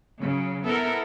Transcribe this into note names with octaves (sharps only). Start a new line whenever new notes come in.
C#3 F#3
B3 E4 A4 A#4